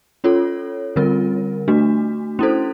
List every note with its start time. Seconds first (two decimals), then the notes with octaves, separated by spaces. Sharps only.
0.24 C#4 F4 A4 C#5
0.96 D3 G3 C4 F4 A#4
1.68 A3 D4 F#4
2.39 C#4 E4 A4 C5